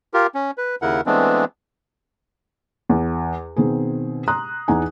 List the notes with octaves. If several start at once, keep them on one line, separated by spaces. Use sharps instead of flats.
F4 G4 A#4
C#4
B4
D#2 C#3 E4 A#4 F#5
E3 G#3 A3 B3 C4 D4
E2
B2 D#3 C4 G#4
A#5 C6 D#6 F#6
E2 D#4 G#5